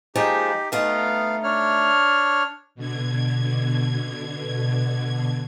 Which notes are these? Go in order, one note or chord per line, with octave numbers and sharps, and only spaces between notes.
F3 G#3 A#3 D#4 G4
D2 A3 B3 D#4 F5
D4 C#5 F6
B2 D3 G#6